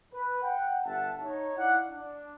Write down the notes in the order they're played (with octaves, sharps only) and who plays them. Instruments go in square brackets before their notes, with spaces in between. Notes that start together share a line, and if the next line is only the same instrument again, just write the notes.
[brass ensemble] B4
F#5 G5
G1 E5 F#5 A5
D#4 C#5
E4 D5 F5 F#5
D4